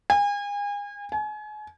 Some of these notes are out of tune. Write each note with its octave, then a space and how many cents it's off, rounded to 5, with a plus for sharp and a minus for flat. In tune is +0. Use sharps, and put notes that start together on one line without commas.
G#5 -35
G#5 +35